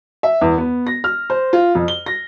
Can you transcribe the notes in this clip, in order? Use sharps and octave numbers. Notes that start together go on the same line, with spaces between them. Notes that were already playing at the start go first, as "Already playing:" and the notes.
E5
E2
B3
A#6
F6
C5
F4
F2
G7
A#6